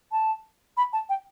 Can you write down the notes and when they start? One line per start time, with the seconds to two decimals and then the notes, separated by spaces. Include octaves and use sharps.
0.12 A5
0.77 B5
0.93 A5
1.09 G5